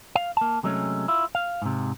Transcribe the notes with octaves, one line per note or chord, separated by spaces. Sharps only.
F5
A#3 A5
C3 F#3 G#3 A3 C4 C#4
E4 F4
F5
G#2 C3